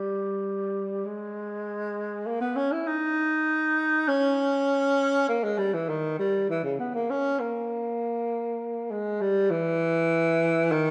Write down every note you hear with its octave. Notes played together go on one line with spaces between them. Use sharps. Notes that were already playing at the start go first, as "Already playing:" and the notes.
Already playing: G3
G#3
A#3
B3
C#4
E4
D#4
C#4
A#3
G#3
G3
E3
D#3
G3
E3
C#3
B3
A#3
C#4
A#3
G#3
G3
E3
D#3